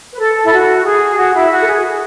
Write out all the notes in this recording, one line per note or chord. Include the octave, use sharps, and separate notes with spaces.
B4
A4
E4
F#4
G#4
F#4
E4
F#4
A4
G#4